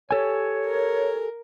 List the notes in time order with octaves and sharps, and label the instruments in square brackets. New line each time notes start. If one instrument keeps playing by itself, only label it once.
[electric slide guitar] G4 A4 G#5 [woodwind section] C#5
[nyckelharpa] A#4